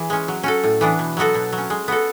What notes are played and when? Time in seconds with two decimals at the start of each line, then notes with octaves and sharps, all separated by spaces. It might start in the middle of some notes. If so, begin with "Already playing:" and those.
Already playing: E3 G#4
0.10 G#3 C#4
0.28 F#3
0.43 C#4 F#4 A4
0.64 A2
0.81 E3 B3 D4
0.99 B2
1.17 F#3 B3 F#4 A4
1.35 B2
1.53 F#3
1.58 C#4
1.70 G#3
1.88 B3 F#4 A4